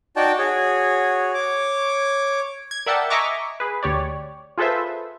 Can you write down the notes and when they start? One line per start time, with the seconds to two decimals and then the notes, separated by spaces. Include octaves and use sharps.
0.16 D#4 F#4 D5 G5 A5
0.39 F#4 G#4 C#5
1.34 C#5 D6
2.71 G#6
2.86 A#4 D5 E5 F#5 G5 A5
3.10 D#5 E5 G#5 A#5 C#6 D6
3.60 G#4 B4
3.83 D2 G4 C#5 D5
4.58 F4 G#4 A4 B4 C5 E5